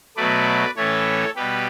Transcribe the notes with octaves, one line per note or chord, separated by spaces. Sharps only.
B2 F#3 A3 B4 D5
A2 E3 A3 C#4 A4 C#5
B2 G3 G4 B4